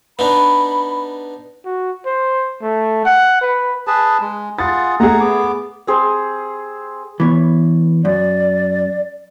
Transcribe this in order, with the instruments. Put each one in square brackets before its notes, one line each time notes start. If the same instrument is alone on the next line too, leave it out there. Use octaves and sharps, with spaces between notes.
[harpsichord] B3 D4 D#4 [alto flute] B5
[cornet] F#4
C5
A3
F#5
B4
[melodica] G#4 B4 A5
G#3
[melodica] F4 G#4 F#5 [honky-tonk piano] A6
[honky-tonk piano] A3 G#4 [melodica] F#5 A#5
[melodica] B3 D6
[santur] C4 G#4 C5
[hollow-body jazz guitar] E3 B3 C#5
[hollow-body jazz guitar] F#2 [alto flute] D5